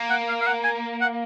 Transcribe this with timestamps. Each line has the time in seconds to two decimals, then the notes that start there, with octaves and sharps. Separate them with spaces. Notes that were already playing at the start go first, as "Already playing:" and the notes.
Already playing: A#3
0.10 F#5
0.28 F5
0.41 F5
0.47 F#5
0.64 G#5
1.01 F#5